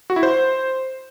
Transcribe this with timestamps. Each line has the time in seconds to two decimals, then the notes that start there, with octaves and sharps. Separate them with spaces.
0.10 F#4
0.16 E4
0.23 C5